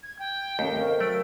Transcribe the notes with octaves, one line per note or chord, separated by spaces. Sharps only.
G#6
G5
D#2 A3 C#4
C4 A#4 C#5 F5
F#3 A3 D7